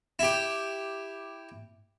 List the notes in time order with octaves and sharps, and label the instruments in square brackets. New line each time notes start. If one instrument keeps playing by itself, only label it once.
[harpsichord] E4 G4